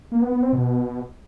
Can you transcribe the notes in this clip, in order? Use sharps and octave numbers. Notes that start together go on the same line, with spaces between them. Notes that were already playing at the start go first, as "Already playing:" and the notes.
A#3
B3
B3
C4
B2